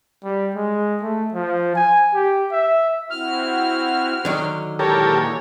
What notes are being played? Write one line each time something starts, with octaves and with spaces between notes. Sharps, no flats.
G3
G#3
A3
F3
G#5
G4
E5
C4 E4 F#4 F6
D3 D#3 F#3
A#2 E3 G#3 G4 A4 A#4 C#5